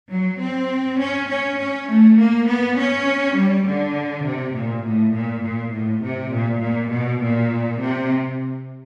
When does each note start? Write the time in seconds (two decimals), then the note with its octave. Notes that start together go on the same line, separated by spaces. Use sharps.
0.12 F#3
0.41 C4
1.01 C#4
1.30 C#4
1.60 C#4
1.90 A3
2.19 A#3
2.49 B3
2.79 C#4
3.37 G3
3.67 D3
4.26 C3
4.56 A#2
4.86 A2
5.15 A#2
5.44 A#2
5.74 A2
6.04 C3
6.34 A#2
6.63 A#2
6.92 B2
7.22 A#2
7.81 C3